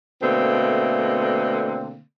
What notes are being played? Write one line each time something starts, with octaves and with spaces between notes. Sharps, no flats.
B2 D3 A3 A#3 C4